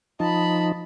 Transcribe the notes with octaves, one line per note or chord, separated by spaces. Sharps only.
F3 D#4 A5 B5